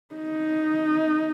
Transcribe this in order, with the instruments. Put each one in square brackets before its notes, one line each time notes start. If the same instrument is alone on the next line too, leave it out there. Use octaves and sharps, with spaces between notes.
[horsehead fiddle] D#4